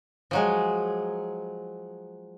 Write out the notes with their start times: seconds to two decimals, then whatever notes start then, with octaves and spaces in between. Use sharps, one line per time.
0.31 F3 F#3 G#3